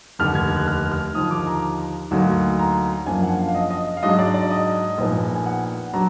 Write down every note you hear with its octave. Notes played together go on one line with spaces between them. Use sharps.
F1 D#2 D3 F6
G#6
F#6
F6
F6
D#2 D3 F3 A#3 D#4 D#6
D6
A#5
D2 D3 F#3 A#3 D#4
A#5
F#1 F#2 F3 A#3 D4 G#5
F#5
F5
F5
D#5
D#5
F5
G#2 F#3 D4 D#5
D5
D5
D#5
A#1 A#2 F3 B3 D#4
G#5
F#5
F#3 D4 A#5